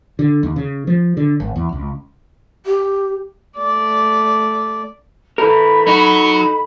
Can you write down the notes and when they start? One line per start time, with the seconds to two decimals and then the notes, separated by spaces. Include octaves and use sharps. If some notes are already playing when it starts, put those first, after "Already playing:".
0.19 D3
0.43 D#2
0.56 C#3
0.87 F3
1.17 D3
1.40 G#1
1.56 E2
1.73 C#2
2.66 G4
3.58 A3 D5
5.38 E3 A4 A#4 B5
5.87 F#3 D#4 F#4